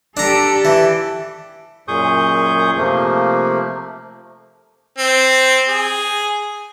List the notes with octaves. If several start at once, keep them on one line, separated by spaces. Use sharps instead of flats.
D4 G4 A4 A#5
E3
F#2 A#2 G#4 C#6 D#6 G6
C3 F3 A3 A#3
C4
G#4